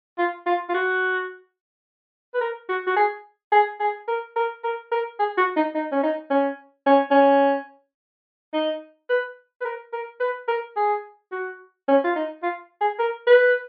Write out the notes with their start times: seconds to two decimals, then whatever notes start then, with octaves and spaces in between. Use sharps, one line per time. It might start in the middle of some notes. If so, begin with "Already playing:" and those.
0.18 F4
0.46 F4
0.69 F4
0.74 F#4
2.34 B4
2.40 A#4
2.69 F#4
2.87 F#4
2.96 G#4
3.52 G#4
3.80 G#4
4.08 A#4
4.36 A#4
4.64 A#4
4.91 A#4
5.19 G#4
5.37 F#4
5.56 D#4
5.75 D#4
5.92 C#4
6.03 D#4
6.30 C#4
6.86 C#4
7.11 C#4
8.53 D#4
9.09 B4
9.61 B4
9.65 A#4
9.93 A#4
10.20 B4
10.48 A#4
10.76 G#4
11.32 F#4
11.88 C#4
12.04 F4
12.16 D#4
12.43 F4
12.81 G#4
12.99 A#4
13.27 B4